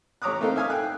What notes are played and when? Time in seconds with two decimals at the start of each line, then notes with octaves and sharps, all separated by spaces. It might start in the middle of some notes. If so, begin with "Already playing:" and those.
0.22 A1 C#5 A#5 D6 D#6 F#6
0.41 A3 A#3 C4 D#4 A4 F5
0.56 E5 F5 G#5 D#6 F6
0.70 G5 F#6